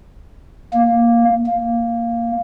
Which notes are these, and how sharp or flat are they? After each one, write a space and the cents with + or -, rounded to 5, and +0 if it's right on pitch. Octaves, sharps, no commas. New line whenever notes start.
A#3 +5
A#3 +0